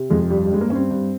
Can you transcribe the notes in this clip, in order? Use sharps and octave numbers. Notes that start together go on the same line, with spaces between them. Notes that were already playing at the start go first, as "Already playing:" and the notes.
Already playing: C3
F2 G#3
G2 G3
G3
G2 G#3
A#3
G2 C#4
C4
G2